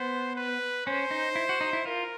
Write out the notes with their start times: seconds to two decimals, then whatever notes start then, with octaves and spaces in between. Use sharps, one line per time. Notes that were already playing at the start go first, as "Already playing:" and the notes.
Already playing: B3 C5
0.36 B4
0.86 C#4 C5
1.11 D#4
1.36 E4
1.49 F#4
1.61 D#4
1.73 E4
1.85 F4 A#4